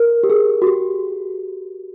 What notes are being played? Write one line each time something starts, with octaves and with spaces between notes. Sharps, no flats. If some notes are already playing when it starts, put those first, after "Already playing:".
Already playing: A#4
G4
G#4
F#4
G4